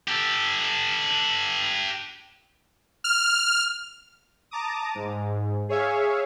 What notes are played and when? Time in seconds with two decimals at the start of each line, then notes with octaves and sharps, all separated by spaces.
0.08 G4 A4
3.04 F6
4.51 A5 A#5 D6 D#6
4.95 G#2
5.69 G#4 C#5 E5 F5